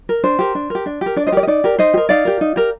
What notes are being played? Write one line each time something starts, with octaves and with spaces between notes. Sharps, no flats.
A#4
D4 C5
G4 A#4
D4
G4 A#4
D4
G4 A#4
D4 D5
C5 D#5
G4 A#4 D5
D#5
D#4 D5
G4 A#4
D#4 C5 D#5
G4
A#4
D#4 D5 F5
G4 A#4
D#4
G4 A#4